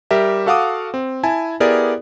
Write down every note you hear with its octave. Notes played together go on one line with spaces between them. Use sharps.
G3 G4 A#4 E5
F#4 A4 F5 F#5 D6 D#6
C4
E4 G#5 A5
B3 E4 G4 G#4 A#4 D5